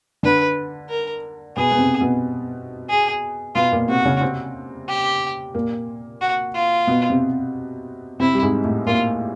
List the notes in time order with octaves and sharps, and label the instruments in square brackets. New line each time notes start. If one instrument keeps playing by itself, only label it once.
[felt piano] D3 D4 [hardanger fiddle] B4
[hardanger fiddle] A#4
[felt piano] B2 B3 [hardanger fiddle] G#4
[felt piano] B3
C3 C4
B2 B3
[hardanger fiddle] G#4
[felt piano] B2 B3 [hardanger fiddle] F4
[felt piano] A#2 A#3
[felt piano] C3 C4 [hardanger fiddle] F#4
[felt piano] C#3 C#4
C3 C4
[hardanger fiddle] G4
[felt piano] A#2 A#3
[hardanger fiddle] F#4
F4
[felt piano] B2 B3
C3 C4
[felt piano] C3 C4 [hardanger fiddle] E4
[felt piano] G3
G#2 G#3
A2 A3
[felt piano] A#2 A#3 [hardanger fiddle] F4